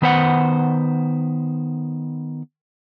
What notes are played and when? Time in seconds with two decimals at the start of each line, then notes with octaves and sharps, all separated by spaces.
0.02 D#3 B3 B4 C5 F#5